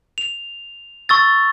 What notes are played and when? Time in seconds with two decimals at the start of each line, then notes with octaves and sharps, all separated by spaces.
0.18 F7
1.09 C#6 E6 A6